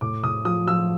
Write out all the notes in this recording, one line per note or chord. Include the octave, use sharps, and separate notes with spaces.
A2 D6
A2 D#6
F3 D#6
F3 E6